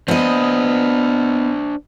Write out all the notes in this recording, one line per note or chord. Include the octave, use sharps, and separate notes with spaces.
B3 D4 C5 D#5